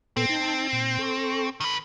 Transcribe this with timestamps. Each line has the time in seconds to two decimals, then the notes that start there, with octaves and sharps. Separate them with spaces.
0.17 A#2 B3 C4 A4
0.29 D#4 A5
0.73 A#2
0.99 A4 C#6
1.61 D#3 B4